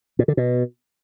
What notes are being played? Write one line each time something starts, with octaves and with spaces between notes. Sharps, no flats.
A#2
D3
B2